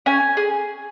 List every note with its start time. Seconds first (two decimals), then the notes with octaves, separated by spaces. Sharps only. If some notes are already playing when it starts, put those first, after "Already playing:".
0.06 C#4 G#5
0.37 G#4